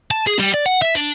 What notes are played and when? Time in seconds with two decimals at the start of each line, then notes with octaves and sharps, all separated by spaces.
0.11 A5
0.27 G#4
0.39 G3
0.54 D5
0.66 F#5
0.82 E5
0.95 D4